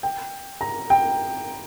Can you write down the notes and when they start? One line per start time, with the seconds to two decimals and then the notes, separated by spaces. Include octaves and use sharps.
0.03 G5
0.61 A#5
0.90 G5